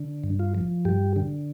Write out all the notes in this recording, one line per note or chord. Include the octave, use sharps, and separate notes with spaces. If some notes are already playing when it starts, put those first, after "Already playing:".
Already playing: D3
G2
F4
F3
G2 G4
D3